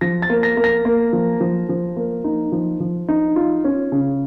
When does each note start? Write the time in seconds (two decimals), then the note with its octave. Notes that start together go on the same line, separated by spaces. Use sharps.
0.01 F3 A#6
0.22 A6
0.30 A#3
0.43 A#6
0.57 A#3
0.64 A#6
0.85 A#3
1.13 F3
1.41 F3
1.69 F3
1.96 A#3
2.24 D#4
2.52 F3
2.80 F3
3.08 D#4
3.36 F4
3.64 C#4
3.92 C#3